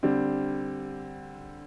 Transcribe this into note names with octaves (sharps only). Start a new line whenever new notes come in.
D3 G3 C4